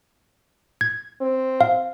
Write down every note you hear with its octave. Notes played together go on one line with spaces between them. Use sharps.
G#6
C4
F5